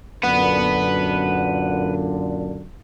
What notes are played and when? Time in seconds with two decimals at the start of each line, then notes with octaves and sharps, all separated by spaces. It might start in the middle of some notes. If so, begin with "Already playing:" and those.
0.24 F#2 A#2 D3 B4 F#5